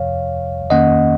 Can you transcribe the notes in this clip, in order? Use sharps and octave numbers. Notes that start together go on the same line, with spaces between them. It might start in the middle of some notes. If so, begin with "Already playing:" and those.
Already playing: F2 C3 F3 C#5 F5
F2 D#3 A#3 C#4 D#5 F#5